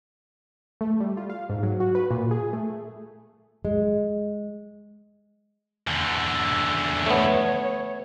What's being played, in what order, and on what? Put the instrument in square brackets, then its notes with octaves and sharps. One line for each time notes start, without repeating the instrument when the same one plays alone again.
[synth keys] A3
G3
F4
F5
G#2
F#3
F#4
B4
A#2
G#4
A3
[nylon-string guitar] G#3
[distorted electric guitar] E2 D3
[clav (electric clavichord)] A3 B3 [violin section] C#5